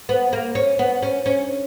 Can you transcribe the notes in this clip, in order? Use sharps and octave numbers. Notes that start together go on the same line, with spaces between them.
B3
A#3
C#4
B3
C#4
C#4